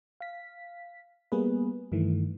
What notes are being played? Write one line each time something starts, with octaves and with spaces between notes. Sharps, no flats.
F5 B6
G3 A#3 B3 G#4 B4
G2 D#3 E3 A3